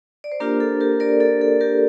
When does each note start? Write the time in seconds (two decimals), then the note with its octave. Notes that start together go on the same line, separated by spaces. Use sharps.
0.24 D5
0.32 C5
0.40 A#3 D4 F4 G4 A#4
0.60 A4
0.80 G4 A#4
1.00 A#4 D5
1.20 A4
1.41 A4
1.61 G4 A#4